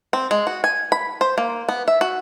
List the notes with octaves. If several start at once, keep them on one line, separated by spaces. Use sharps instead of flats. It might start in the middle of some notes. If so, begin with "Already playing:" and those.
C4
G#3
F#4
G#5
B5
C5
A#3
B3
E5
F#4